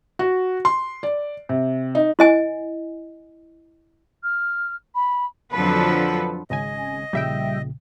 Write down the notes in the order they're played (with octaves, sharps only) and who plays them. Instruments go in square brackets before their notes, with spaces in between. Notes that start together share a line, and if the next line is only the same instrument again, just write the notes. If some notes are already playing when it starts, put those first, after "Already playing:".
[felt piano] F#4
C6
D5
C3
D#4
[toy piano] E4 D#5 G#5
[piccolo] F6
B5
[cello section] F2 D3 F3 F#3 A4 B4
[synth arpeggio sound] G#1 C#3 G#5 [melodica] D#5
[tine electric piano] A#1 A#2 C#3 [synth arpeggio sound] G3 E5 G5